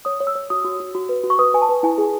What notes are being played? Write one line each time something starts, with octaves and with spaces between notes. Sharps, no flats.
C#5 D#6
C#5
E6
C#5
F#4 D#6
F#4
F#4
F#4
B4
F#4
C#6
B4 D#6
B4 G#5
A5
B4
E4 G#5
G#4